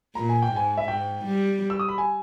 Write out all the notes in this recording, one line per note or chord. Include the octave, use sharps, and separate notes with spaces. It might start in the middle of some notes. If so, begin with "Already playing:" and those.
A#2 A#5
G#5
G5
G#2 G#5
E5
G#2 G5
G3
E6
D#6
B5
G#5